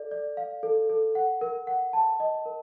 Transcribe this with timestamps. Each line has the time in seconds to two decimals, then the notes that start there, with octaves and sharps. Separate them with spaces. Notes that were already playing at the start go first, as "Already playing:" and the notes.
Already playing: A4 D5
0.11 D5
0.37 F5
0.63 A4
0.89 A4
1.15 F#5
1.41 A#4
1.67 F#5
1.93 A5
2.20 D#5
2.46 A#4